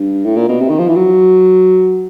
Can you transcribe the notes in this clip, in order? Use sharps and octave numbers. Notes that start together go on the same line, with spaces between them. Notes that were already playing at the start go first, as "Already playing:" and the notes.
Already playing: G2
A2
A#2
B2
C3
D#3
F3
E3
F#3